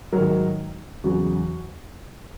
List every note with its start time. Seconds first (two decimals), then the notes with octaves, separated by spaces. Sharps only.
0.13 G#2 D#3 F#3 A#4 C#5
1.04 E2 C#3 F#3 F#4